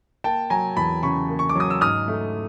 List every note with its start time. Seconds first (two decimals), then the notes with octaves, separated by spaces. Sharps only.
0.24 A#3 G5 A5
0.50 F#3 G#5 A#5
0.77 E2 A5 B5
1.03 C#3 B5 C#6
1.29 A#3
1.39 C#6
1.49 D6
1.55 F#3 D#6
1.70 E6
1.81 G#2 D#6 F6
2.08 A3